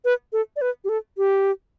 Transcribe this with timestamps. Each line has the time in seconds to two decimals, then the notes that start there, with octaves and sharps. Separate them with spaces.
0.05 B4
0.33 A4
0.56 D5
0.61 B4
0.84 G4
0.89 A4
1.18 G4